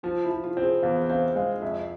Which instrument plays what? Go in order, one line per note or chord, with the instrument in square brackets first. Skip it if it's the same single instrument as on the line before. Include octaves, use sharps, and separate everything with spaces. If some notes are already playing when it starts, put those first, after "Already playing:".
[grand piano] F3 [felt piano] F4
[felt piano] E4
[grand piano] F3
[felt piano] F4
[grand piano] C4
[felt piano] G#4
[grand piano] E2 [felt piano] F5
[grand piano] C4 [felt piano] F5
[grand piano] G#3 [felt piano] F5
[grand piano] F2 [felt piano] E5